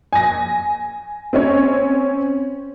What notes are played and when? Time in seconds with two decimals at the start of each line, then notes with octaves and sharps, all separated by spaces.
0.13 G#5 A#6
1.33 C4 C#4 C#5